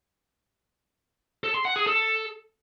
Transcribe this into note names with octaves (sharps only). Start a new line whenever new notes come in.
A4
C6
F#5
G#4
A4